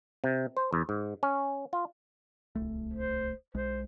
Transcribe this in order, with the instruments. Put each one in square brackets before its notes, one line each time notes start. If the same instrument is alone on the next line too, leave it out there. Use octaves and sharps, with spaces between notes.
[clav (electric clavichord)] C3
C5
E2
G#2
C#4
F4
[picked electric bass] D1 C2 A3
[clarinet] C5
[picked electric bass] B1 G#3 [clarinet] C5